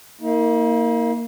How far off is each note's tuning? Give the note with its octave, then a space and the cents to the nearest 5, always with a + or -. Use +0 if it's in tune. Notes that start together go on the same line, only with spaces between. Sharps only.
A#3 -10 D#4 +45